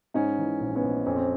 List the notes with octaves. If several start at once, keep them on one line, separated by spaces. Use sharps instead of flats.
G#2 C#4 D#4
E3
A#1
B3 C#4
A#1
F2 C#4
C4